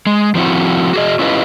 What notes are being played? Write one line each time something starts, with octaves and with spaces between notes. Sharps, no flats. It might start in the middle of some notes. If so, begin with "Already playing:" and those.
G#3
F3 C4 E4 F#4
F#4 G#4 D#5
C#4 E4 F4 G4 B4 D#5